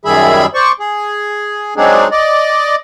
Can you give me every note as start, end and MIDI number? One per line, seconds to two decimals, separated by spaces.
0.05 0.46 42
0.05 0.46 51
0.05 0.46 55
0.05 0.46 68
0.05 0.46 76
0.05 0.46 83
0.54 0.72 72
0.54 0.72 74
0.54 0.72 85
0.80 1.74 68
1.77 2.08 54
1.77 2.08 56
1.77 2.08 60
1.77 2.08 62
1.77 2.08 63
1.77 2.08 68
2.12 2.75 74
2.12 2.75 75